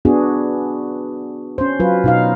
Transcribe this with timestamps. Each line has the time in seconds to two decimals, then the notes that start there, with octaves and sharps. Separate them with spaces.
0.05 B3 D4 F#4 G#4
1.58 C#4 C5
1.80 F#3 F4 B4
2.04 B2 D#4 F5